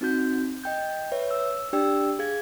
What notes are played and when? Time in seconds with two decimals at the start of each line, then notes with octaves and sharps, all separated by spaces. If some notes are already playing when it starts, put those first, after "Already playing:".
0.01 C4 D#4 F#4 G6
0.64 D#5 G5 G6
1.12 B4 C#5 E5
1.31 E6
1.73 D4 G4 D5 G5 E6
2.19 G#4 F5 G#6